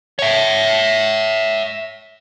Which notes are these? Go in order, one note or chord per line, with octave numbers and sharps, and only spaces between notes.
C#5 E5